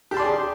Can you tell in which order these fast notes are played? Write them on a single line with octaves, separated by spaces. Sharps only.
G4 A5 C6 D5 G#4